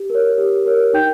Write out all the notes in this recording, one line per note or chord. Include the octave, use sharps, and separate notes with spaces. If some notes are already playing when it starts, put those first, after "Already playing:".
Already playing: G4
A#4 C#5
G4
A#4 C#5
D#4 G5 G6